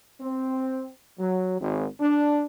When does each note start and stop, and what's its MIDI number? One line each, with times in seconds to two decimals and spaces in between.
0.21 0.92 60
1.19 1.59 54
1.60 1.86 32
2.01 2.45 62